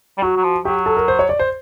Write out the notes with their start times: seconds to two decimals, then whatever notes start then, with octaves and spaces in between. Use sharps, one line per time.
0.18 G3
0.22 F#3 F#4
0.37 F#3
0.44 F3
0.65 F#3 G4
0.86 A4
0.97 A#4
1.08 C5
1.19 C#5
1.29 D5
1.39 C5